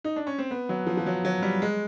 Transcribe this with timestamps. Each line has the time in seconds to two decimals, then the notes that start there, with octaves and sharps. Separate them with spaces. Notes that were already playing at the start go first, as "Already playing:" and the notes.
0.04 D#4
0.16 D4
0.27 C#4
0.38 C4
0.51 B3
0.69 F#3
0.87 F3
0.97 F3
1.06 F#3
1.25 F#3
1.42 G3
1.62 G#3